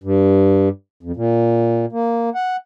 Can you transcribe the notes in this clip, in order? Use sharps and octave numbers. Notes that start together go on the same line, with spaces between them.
G2
F2
A#2
A#3
F#5